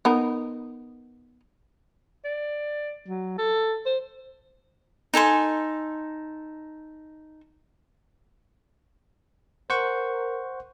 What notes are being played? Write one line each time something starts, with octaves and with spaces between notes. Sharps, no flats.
B3 D#4 A#4
D5
F#3
A4
C5
D#4 A4 G#5 C6
A#4 C5 F#5 C#6